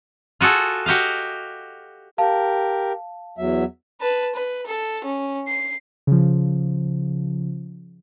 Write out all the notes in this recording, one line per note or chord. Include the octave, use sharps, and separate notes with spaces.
F4 F#4 G#4 A4
F#4 G4 D#5 F5
G4 A#4 F5 A5
E2 F#3 E5
B4 A5
B4
A4
C#4
C7
C#3 F3